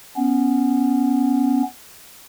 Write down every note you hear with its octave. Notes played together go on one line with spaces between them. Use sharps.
B3 C#4